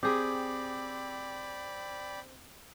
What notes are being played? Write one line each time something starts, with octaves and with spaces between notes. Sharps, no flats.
C4 G4 G#4 D5 G5 B5 D6